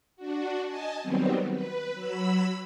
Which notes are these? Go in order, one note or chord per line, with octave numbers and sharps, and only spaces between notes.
D4 F#4
D#5 G#5 A5
D#3 F#3 G3 B3 C4
B4
F#3 B5 E6